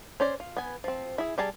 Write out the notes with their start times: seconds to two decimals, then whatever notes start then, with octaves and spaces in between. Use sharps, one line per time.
0.20 C#4 C5 D5
0.40 F4
0.57 B3 G#5
0.84 F3 C4
1.18 E4 G#4
1.38 G3 G#4 A5 A#5